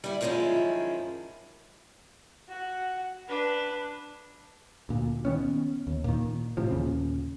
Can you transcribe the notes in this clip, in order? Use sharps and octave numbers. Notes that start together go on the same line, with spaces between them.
G3 E4
F#2 D#3 F3 G#3 C#4 E4
F#4 F#5
D4 B4
D2 A#2
D#3 B3 C#4
D#2
A#2 D#3
A2 C3 F3
D#2 A#2 C#3